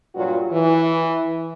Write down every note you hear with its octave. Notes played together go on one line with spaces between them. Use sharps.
G2 A#2 F#3 F4 F#4
E3